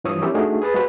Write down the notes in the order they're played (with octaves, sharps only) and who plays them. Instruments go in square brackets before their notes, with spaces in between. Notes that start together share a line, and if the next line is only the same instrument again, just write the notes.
[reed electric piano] G2 E3 F3 C#5 D#6 E6
C4 C#4 E4 G4 A#4
A3 D4 D#4 F#4 G#4
G#4 B4 A6
G#3 F#4 B4 C5 G#5